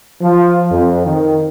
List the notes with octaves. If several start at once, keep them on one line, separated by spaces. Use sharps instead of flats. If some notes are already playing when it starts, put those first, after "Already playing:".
F3
F2
D#3